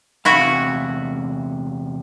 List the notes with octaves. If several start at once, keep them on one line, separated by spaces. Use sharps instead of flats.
E2 C3 E4 F#4 F5